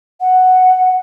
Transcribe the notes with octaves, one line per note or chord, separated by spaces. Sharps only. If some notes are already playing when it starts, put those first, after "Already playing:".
F#5